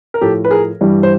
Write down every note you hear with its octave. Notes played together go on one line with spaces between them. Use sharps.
A#4
A2 F3 G4 A4
B4
G#4 A#4
G2 E3 G3
C5